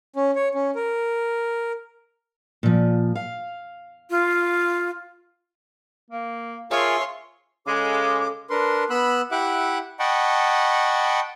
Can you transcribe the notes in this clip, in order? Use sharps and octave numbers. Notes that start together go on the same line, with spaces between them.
C#4
C#5
C#4
A#4
A#2 F3
F5
F4
A#3
F4 G#4 A#4 C#5 E5 G#5 C6
C#3 G#3 A4 D6
D4 A#4 B4 C6
B3 B5 E6 F#6
E4 G4 E5 F#5 D6 F#6
D#5 F#5 G5 A5 B5 C#6